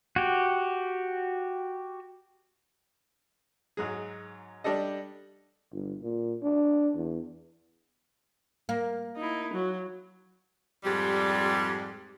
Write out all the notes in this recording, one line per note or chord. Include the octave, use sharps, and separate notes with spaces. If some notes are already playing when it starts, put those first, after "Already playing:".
F#4 G4
G#2 F#3 G#4
G3 D4 G4 A4 D#5
G1
A#2
D4
E2
A#3
D#4 E4
F#3
F2 G#2 G3 G4